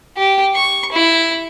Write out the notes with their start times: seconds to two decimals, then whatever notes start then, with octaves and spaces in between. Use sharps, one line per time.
0.17 G4
0.54 C#6
0.92 E4